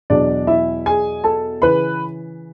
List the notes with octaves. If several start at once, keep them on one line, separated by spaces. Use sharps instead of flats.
E2 B2 F#3 D4 D5
E4 E5
G#4 G#5
A4 A5
C#3 E3 B4 B5